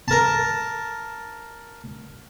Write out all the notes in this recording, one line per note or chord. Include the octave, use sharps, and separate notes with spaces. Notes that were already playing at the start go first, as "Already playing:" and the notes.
A#4 A5